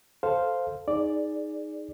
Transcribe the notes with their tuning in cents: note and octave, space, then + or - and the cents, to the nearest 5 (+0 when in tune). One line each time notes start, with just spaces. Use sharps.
A4 +5 C5 +0 F5 +0
D#4 +0 G#4 +0 D5 +0